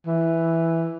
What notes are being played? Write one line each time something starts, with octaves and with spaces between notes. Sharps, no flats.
E3